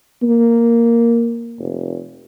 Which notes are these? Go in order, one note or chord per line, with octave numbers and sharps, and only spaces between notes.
A#3
F1